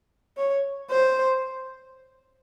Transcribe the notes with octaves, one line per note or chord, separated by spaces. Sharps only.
C#5
C5